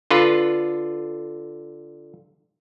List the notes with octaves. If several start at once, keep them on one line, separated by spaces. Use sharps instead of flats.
D3 F4 B4